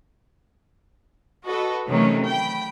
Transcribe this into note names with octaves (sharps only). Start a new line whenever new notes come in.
F#4 A4 B4 D#5
C3 D#3 E3 F#3 A3 C#4
G5 B5